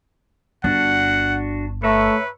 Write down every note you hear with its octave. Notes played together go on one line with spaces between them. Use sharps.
G1 D4 F#4 F#5
A3 B4 C#5 E5 A#5